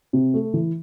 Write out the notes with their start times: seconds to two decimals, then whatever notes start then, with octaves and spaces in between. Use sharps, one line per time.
0.13 C3
0.34 A3
0.53 E3